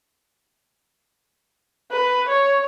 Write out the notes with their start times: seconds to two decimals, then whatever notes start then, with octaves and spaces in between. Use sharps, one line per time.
1.91 B4
2.29 C#5